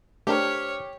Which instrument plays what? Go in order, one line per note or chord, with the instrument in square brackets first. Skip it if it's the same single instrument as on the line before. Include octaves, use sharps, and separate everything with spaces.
[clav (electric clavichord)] A3 D4 A#4 [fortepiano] G4 [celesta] C5 F6 [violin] C#5